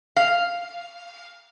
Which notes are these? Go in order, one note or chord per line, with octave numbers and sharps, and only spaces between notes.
F5